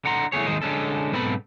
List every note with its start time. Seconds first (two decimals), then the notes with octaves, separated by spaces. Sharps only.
0.05 D3 F#5 A#5 C6
0.32 E3 A3 B3 G#4 C#5
0.46 D#2 D#3 G#3 C5 D#5
0.62 D3 G#3 C#4 A4
1.12 B1 G#2 B3 C4 A4 B5